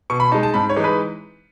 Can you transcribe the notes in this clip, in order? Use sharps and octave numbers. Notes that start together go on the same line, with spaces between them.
B2 C#6
B5
G#3 D#4 A5
A5
G#2 B5
C#5
E3 G#3 D#4
B4